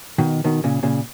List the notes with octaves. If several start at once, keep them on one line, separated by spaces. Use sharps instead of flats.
B2 D#3
B2 D#3
A#2 C#3
A#2 C#3